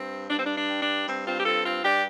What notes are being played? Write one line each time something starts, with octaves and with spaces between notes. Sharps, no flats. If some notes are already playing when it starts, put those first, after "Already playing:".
Already playing: G2 C4
G2 D4
C4
D4
D4
G3
D4
G2 C4
C4 F4
G4
C4 F4 A4
C4 F4
G2 D4 G4